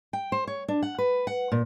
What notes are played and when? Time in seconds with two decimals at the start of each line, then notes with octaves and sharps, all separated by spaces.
0.13 G5
0.32 C5
0.47 C#5
0.68 D4
0.82 F#5
0.98 B4
1.27 F#5
1.52 A#2